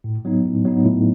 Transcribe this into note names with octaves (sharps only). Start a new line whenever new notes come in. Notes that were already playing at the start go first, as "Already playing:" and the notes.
A2
F#3 B3 D#4
A2
F#3 B3 D#4
A2